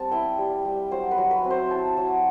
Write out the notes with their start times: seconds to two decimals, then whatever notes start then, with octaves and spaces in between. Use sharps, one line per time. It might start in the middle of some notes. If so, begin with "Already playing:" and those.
Already playing: G3 C4 A5
0.11 E4 G5
0.38 G3
0.65 G3
0.91 F#3 C5
1.11 B4
1.18 F#3
1.31 B4
1.44 C4
1.51 C5
1.71 E4 A5
1.97 F#3